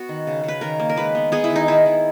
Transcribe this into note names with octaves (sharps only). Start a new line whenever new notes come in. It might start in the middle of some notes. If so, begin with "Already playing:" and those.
Already playing: B3 F#4
D#3
C#3
C#3 B4
D#3 A#4
A#3
A#4
G#3 B4
B3
B3 G#4
E4
D#3
D#4
D#3 E4
D#3